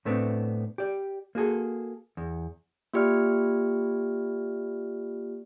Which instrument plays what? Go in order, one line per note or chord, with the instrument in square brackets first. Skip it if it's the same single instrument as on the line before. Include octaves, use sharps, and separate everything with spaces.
[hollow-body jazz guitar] A2 A3 B3 C4 D4
G4 D5
A#3 F#4 G#4 A4
E2
[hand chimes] A#3 F4 G4 D5 F6